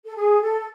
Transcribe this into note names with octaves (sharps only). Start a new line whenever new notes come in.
A4
G#4
A4